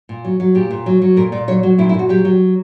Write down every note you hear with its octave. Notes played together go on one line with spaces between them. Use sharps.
A#2
F#3
F#3
A#2 G4
A#2
F#3
F#3
A#2 A#4
A#2 D5
F#3 C#5
F#3 F#4
A#2 E4
E4
A#2
F#4
F#3 G4
F#3